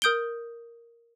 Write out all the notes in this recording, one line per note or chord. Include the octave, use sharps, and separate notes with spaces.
A#4 D#6 G6 D7 G7